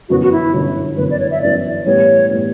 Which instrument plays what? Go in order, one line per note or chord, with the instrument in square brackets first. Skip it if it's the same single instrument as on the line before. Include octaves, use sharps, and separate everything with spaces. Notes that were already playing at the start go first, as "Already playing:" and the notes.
[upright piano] G1 F#2 E3 B3 [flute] F#4
[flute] F#4
E4
[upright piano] G1 F#2 E3 B3
[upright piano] G1 F#2 E3 B3 [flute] B4
[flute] D5
C#5
E5
[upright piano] G1 F#2 E3 B3 [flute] D5
[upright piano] A2 E3 G3 B3 [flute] C#5
[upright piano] A2 E3 G3 B3